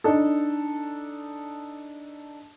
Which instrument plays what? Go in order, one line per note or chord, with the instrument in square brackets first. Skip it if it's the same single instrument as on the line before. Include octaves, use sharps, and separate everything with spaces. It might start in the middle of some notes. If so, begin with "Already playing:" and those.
[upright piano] D4 D#4 A4